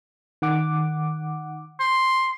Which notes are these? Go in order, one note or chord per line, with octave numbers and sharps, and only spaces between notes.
D#3 F#5 D6
C6